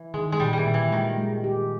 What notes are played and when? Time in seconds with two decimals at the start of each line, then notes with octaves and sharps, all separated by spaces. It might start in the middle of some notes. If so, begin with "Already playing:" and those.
Already playing: E3
0.14 D#3 G#3
0.32 G#3
0.40 A#2 G3
0.53 E3 G3
0.66 A#2
0.74 E3
0.92 D#3 G#3
1.18 G#3
1.44 G4